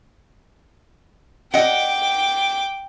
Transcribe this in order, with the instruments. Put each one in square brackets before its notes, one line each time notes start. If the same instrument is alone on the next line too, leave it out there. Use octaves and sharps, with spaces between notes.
[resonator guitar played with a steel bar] D#5 F#5 [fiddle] G5 D6